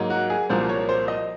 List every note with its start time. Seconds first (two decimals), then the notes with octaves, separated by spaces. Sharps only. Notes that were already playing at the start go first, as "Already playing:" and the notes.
Already playing: G#2 F#3 A#3 D#4
0.10 F#4
0.30 G#4
0.49 C2 A#2 F3 A#3 C5
0.69 C#5
0.89 C5
1.08 D#5